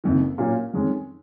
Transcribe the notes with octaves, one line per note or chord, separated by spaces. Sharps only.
F#1 F2 D#3
A#2 F#3 A#3 C#4
F2 D#3 G#3 C#4